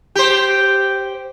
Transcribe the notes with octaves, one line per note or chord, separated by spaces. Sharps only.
G4 C5